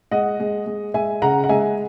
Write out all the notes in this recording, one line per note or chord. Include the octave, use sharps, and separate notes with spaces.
G#3 D#5 F#5
G#3
G#3
G#3 E5 G#5
C#3 F#5 A#5
F#5
G#3 E5 G#5